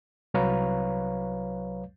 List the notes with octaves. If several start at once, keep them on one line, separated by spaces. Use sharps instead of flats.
C2 F#3 B4 C#5 F5 A#5